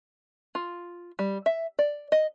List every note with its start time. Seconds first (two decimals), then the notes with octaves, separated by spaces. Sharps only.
0.55 F4
1.19 G3
1.46 E5
1.79 D5
2.12 D#5